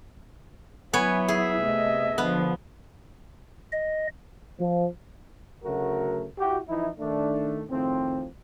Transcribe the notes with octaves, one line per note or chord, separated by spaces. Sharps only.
F#3 B3 E4 C#5 G#5
G#4 E5
C3 A3 D#5
D3 F3 B3
D#5
F3
D2 C#3 F#3 A3 F#4 A#4
E4 F#4 G4
E3 F3 D#4 E4
D#3 A3 D4
A2 D#3 F3 C4